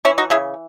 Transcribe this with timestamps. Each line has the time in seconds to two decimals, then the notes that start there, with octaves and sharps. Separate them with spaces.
0.05 E3 C#4 E4
0.18 D#4 F#4
0.30 C#3 E4 G#4